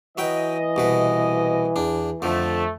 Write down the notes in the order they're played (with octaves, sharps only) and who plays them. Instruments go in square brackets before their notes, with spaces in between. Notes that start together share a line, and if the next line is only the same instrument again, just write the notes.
[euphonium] E3 [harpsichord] F#3 B4 G5 [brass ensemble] D#5
[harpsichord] C2 B2 B4
E2 D4
[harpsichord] F2 D3 F3 [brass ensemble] A3